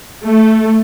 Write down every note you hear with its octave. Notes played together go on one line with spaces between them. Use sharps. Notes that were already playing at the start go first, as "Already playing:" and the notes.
A3